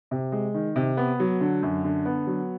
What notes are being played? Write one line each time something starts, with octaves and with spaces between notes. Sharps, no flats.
C3
G#3
D#3
C3
B3
F#3
D3
F#2
D3
B3
F#3